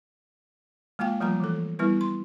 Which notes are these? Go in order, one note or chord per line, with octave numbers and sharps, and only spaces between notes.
G#3 A#3 F4 F5 G5
F3 G3 A3 A#3 F4 A#5
E3 A4
G3 B3 E4 B4
C6